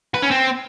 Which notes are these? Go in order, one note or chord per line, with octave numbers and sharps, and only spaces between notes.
B4
C#4
C4